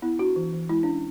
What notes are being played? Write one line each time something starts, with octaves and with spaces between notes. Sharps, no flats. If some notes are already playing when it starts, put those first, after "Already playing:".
B3 E4
D4 F#4
E3
E3
G#3 E4
C#4 D4